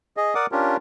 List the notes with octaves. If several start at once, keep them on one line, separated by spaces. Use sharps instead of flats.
G#4 D#5
A#4 D5 F#5 D6 D#6
C#4 D4 F4 G4 A#4